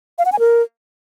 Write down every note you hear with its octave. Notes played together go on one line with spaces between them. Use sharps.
F5
F#5
G#5
A#4